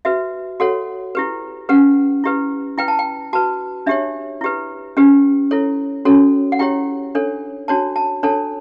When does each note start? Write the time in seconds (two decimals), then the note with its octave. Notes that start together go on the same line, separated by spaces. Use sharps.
0.05 F#4 B4 E5
0.60 F#4 A4 C#5 F#5
1.15 E4 G4 B4
1.69 C#4 G4 B4 F#5
2.24 E4 G4 B4
2.78 E4 B4 G5
2.88 A5
2.99 G5
3.33 F#4 B4 A5
3.86 D4 G4 C#5 E5
4.41 E4 G4 B4
4.97 C#4 G4 B4
5.51 E4 A4 C#5
6.05 C#4 F#4 A4 C#5
6.52 F#5
6.59 E4 G4 C#5 G5
7.15 D4 A4 C#5
7.68 D4 F#4 C#5 A5
7.96 A5
8.23 D4 A4 C#5 A5